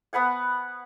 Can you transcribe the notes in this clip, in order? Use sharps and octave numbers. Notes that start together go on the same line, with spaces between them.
B3 B4 F#5 G#5